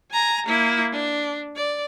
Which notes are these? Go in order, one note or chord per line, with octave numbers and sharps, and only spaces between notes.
G#5 A#5
A#3 E4
D4
D5